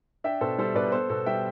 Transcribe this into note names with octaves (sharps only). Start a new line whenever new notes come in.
D4 E5 G5
B2 A4 C5
G3 A4 C5
B2 B4 D5
B3 A4 C5
B2 A4
G3 E5 G5